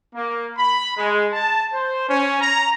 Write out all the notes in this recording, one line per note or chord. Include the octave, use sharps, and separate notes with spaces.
A#3
B5
G#3
A5
C5
C#4
A#5